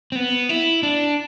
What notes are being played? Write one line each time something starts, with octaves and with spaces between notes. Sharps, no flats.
C4
B3
E4
D4